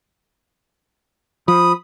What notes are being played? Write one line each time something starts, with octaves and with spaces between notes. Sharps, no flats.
F3 B5 D#6